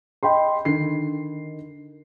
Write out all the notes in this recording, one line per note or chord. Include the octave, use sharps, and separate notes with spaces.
D#5 G5 B5 C6
D3 D#3 C7